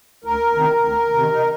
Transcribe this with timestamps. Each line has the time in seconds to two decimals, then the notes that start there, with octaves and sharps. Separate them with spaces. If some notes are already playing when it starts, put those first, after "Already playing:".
0.24 D2 A#4
0.54 C3 D#3
0.84 D2
1.13 C3 D#3
1.32 D#4